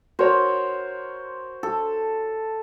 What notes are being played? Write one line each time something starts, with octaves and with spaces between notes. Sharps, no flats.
F#4 A#4 C5 C#5
A4